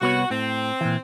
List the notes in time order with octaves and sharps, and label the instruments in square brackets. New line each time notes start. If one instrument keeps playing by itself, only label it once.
[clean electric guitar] C2 B3 C#5 [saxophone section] F#4
[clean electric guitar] A2 [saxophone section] C4
[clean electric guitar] A#2 E3